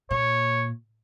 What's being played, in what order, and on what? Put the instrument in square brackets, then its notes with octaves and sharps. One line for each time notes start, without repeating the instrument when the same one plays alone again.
[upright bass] A#2 [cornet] C#5